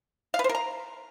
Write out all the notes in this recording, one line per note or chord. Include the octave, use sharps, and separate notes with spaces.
F5
B4
C5
A#4
A#5